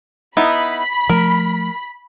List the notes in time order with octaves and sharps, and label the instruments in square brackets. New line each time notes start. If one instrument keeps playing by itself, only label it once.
[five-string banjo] B3 D#4 E4 [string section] B5 B6
[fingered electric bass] F3 A3 [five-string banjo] A#4